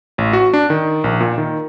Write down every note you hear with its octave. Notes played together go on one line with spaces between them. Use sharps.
A1
F#4
D4
D#3
A#1
A#2
D#3